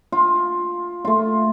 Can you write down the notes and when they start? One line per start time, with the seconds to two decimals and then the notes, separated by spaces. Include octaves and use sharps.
0.12 F4
1.05 A3 F4